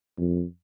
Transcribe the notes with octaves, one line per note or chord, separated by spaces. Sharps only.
F2